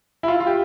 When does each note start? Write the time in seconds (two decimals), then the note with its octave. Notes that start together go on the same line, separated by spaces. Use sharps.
0.23 E4
0.28 F4
0.40 F4
0.47 G4